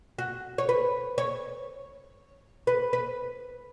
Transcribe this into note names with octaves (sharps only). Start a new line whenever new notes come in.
F#4
C#5
B4
C#5
B4
B4